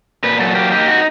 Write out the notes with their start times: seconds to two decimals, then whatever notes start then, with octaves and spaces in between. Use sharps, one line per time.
0.24 A#2 B4
0.39 F#3 A4
0.55 A#3 G4
0.71 D#4 G4
0.87 F#4